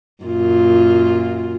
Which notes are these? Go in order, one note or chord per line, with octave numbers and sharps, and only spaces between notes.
F#2 A#2 F4